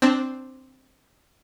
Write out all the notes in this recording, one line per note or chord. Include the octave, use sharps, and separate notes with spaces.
C4 D4